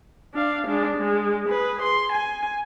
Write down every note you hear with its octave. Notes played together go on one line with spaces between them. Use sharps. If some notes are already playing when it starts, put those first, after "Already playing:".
D4 F5
G#3 D4
G#3
G#4 B4
C6
G#5